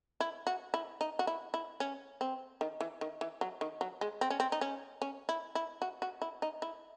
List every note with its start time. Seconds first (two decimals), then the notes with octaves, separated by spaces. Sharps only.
0.20 E4
0.47 F#4
0.74 E4
1.01 D#4
1.19 F#4
1.27 E4
1.54 E4
1.80 C#4
2.21 C4
2.61 D#3
2.81 E3
3.01 D#3
3.21 E3
3.41 F#3
3.61 D#3
3.81 F#3
4.01 G#3
4.21 C4
4.30 C#4
4.40 C4
4.52 D#4
4.61 C#4
5.02 C#4
5.29 E4
5.55 E4
5.82 F#4
6.02 F#4
6.22 E4
6.42 D#4
6.62 E4